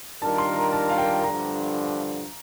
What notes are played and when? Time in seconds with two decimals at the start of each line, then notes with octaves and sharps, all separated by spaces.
0.21 D#3 G3 D4 F4 A#4 A5
0.38 C6
0.56 A#5
0.72 A5
0.90 F5
0.98 G5
1.24 G2 D3 F3 A#5